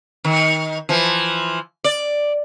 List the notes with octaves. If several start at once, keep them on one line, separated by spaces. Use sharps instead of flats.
D#3
E3 F3
D5